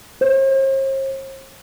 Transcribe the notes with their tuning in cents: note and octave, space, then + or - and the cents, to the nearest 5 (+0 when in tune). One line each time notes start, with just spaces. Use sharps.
C5 +45